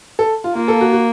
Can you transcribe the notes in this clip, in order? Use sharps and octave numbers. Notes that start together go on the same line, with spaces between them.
A4
F4
A#3 F4
A4
F#4
F#4